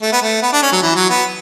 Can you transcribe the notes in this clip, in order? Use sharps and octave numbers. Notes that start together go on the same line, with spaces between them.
A3
B3
A3
B3
D4
C#4
F#3
E3
F#3
B3